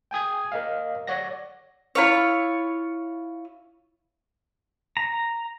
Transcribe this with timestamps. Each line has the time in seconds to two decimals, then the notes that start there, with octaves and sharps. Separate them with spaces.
0.11 G5 G#5 D#6 G#6
0.52 A#4 D#5 F5
1.07 C#5 D5 F#5 A#6
1.95 E4 F4 C#5
4.97 A#5